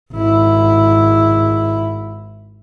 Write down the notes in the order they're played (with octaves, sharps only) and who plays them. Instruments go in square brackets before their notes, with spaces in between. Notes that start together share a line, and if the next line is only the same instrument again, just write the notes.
[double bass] G#1 E4